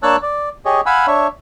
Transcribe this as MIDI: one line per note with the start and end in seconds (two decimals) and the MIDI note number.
0.03 0.16 58
0.03 0.16 62
0.03 0.16 73
0.03 0.16 81
0.03 0.16 88
0.03 0.16 90
0.22 0.49 74
0.65 0.81 67
0.65 0.81 68
0.65 0.81 73
0.65 0.81 75
0.86 1.06 77
0.86 1.06 78
0.86 1.06 80
0.86 1.06 83
0.86 1.06 88
1.07 1.27 62
1.07 1.27 73
1.07 1.27 76